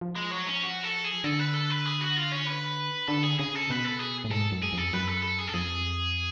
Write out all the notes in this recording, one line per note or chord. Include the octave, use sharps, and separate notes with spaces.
F3
G#3
F#3
C#4
F#4
A4
G#4
D3 A4
B4
A4
B4
G#4
F#4
F4
C#4
B4
D3 A4
G#4
C#3 G#4
A4
B2 B4
A4
G#4
A2
G#2 A4
F#2
G#4
F2 A4
F#2 B4
A4
A4
G#4
A4
F2 G#4